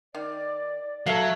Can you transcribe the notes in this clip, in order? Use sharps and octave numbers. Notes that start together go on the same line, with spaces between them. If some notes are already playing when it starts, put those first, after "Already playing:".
D#3 D5
F#3 A4 E5 F5